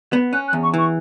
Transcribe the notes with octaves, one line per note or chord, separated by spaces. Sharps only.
B3
C#4 F#6
F#6
E2
C#6
E3 C#6